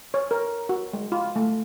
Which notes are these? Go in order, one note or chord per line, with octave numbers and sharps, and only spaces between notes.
C#5
A#4
F#4
G#3
F4
A3